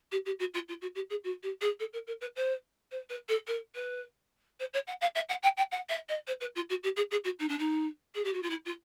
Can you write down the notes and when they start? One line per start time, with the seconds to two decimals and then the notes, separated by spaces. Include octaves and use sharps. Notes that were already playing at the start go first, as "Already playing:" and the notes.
0.12 G4
0.26 G4
0.39 F#4
0.54 F4
0.68 F4
0.81 F#4
0.95 G4
1.10 G#4
1.24 F#4
1.43 G4
1.61 G#4
1.80 A4
1.93 A#4
2.07 A#4
2.21 B4
2.36 C5
2.91 C5
3.10 B4
3.29 A4
3.47 A#4
3.75 B4
4.60 C5
4.73 C#5
4.87 F#5
5.01 F5
5.15 E5
5.29 F#5
5.43 G5
5.57 G5
5.72 F#5
5.89 E5
6.09 D#5
6.27 C5
6.41 B4
6.55 F4
6.69 F#4
6.83 G4
6.96 G#4
7.11 G#4
7.24 F#4
7.39 D#4
7.49 D4
7.59 D#4
8.15 G#4
8.24 G4
8.33 F#4
8.42 F4
8.50 E4
8.65 F4